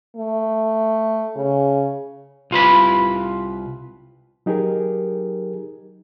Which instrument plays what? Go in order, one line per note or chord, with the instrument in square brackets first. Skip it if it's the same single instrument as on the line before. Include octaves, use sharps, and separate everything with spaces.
[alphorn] A3
C#3
[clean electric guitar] C2 F4 B4 B5
[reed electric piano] F#3 D#4 G4 G#4 A#4